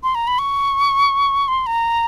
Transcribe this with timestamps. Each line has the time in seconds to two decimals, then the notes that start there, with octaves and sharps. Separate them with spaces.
0.03 C6
0.15 A#5
0.27 B5
0.39 C#6
1.48 C6
1.66 A#5